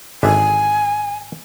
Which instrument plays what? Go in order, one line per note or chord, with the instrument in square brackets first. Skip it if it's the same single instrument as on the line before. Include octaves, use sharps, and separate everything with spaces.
[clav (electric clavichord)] G#1 D3 E5 [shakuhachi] G#5